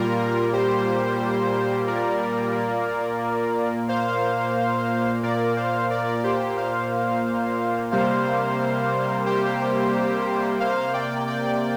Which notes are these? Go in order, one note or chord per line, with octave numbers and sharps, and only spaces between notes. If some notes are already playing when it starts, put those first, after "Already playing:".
Already playing: A#2 G3 A#3 F4 A#4
G4 C5
A#4 D5
A#2 A#3
C5 F5
A#2 A#3 A#4 D5
C5 F5
A#4 D5
G4 C5
C5 F5
C3 G3 A#3 C5 F5
G4 C5
C3 A#3 C5 F5
D5 G5
D5 G5